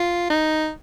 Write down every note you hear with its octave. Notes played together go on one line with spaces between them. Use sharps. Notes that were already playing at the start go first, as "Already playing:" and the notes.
Already playing: F4
D#4